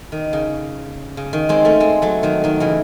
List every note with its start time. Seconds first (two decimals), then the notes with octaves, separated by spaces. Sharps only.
0.12 D#3
0.33 C#3
1.17 C#3
1.33 D#3
1.49 G#3 C4
1.65 A3 C#4
1.80 G#3 C4
2.02 F#3 A3
2.23 D#3 F#3
2.44 D#3 F#3
2.60 C#3 E3